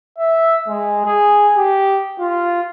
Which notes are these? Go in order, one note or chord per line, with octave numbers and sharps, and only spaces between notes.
E5
G#3
G#4
G4
F4